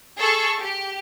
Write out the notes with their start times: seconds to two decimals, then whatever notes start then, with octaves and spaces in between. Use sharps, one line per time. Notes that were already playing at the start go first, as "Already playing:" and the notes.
0.18 G#4 A4 C#6
0.60 G4